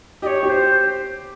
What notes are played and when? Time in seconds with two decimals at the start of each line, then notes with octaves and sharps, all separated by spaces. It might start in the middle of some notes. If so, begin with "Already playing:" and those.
0.22 G4 D#5
0.27 C#5
0.43 G4
0.49 C5